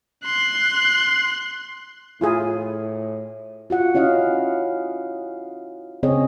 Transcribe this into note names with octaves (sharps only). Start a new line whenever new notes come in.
C6 F#6
A2 E4 F4 G#4
F4 F#4 F#5
C#4 E4 D#5 F5
C#3 C4 G#4 C#5 D#5